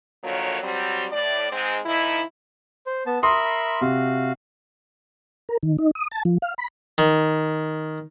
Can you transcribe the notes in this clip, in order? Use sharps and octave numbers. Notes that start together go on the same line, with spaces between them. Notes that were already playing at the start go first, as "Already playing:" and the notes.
D3 D#3 F3 F#3 A#3 C#5
F#3 G3 C4
A2 D5
G#2 G#3 C4
D#3 F3 D#4 E4
C5
B3 A5
A#4 E5 B5 C6 D#6
C3 F#4 F5
A#4
D#3
D#4
D#6
A5
F3
F5
B5
D#3